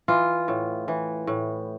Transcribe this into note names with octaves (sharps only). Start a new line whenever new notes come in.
E3 F4
A2
E3
A2